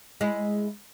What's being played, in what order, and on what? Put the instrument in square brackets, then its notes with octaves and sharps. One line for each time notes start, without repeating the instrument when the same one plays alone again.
[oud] G#3 E4